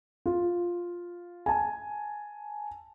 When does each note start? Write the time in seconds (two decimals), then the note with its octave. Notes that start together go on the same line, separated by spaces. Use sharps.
0.26 F4
1.46 G#5 A5